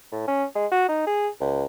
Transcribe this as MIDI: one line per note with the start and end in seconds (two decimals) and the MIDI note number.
0.12 0.23 45
0.28 0.44 61
0.55 0.66 56
0.71 0.85 66
0.88 1.03 63
1.07 1.28 68
1.40 1.64 37